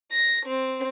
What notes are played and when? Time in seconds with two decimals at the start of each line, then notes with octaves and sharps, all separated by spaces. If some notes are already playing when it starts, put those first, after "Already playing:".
0.12 A#6
0.46 C4